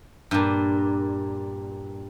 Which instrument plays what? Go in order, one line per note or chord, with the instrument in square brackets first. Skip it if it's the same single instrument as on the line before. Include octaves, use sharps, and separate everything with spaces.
[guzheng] G2 A#2